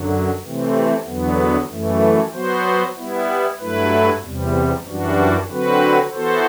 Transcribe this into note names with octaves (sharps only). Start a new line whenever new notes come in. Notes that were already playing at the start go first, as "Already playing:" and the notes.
Already playing: F#2 D3 F#3
C3 E3 A3 C4
E2 D3 F#3 B3
F#2 E3 A3
F#3 B3 F#4 C5
G3 B3 E4
G2 F#3 A3 E4 B4
E2 C3 G3
F#2 E3 G3 D4 F#4
D3 F#3 C4 F#4 B4
E3 B3 F#4 A4 C5